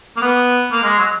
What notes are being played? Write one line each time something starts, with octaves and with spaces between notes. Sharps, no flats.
A#3
B3
A#3
G#3
F#3